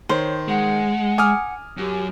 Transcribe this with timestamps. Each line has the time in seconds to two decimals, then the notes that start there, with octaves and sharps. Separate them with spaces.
0.09 D#3 C5 C#5
0.48 G#3 F#5
1.18 G#5 D6 D#6 F6
1.77 F#2 G4